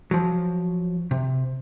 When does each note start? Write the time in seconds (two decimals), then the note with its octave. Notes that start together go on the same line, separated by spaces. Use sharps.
0.11 F3 F#3
1.11 C3